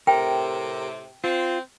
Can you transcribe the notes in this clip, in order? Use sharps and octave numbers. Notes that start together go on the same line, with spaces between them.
A2 C3 A#4 G5
C4 F4